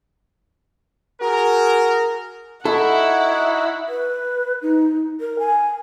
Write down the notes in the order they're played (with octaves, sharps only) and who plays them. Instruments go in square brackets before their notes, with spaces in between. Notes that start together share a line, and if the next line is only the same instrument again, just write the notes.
[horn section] F#4 G#4 A#4
[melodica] D#4 F#4 [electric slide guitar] E4 [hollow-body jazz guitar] A4 [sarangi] F#5
[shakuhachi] B4
D#4
A#4
G#5